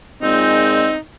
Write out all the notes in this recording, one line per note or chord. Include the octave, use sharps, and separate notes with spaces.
A#2 G#3 C4 D#4